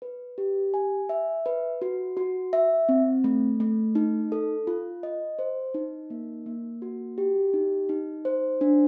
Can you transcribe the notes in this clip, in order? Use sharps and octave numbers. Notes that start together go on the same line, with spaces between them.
B4
G4
G#5
E5
B4
F#4
F#4
E5
C4
A3
A3
D#4
A4
F4
D#5
C5
D#4
A#3
A#3
F#4
G4
D#4
D#4
C5
D4